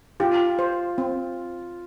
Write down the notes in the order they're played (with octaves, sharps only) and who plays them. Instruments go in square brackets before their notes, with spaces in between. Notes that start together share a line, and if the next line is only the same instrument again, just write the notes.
[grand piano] F4 [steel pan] G4
[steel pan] C5
C4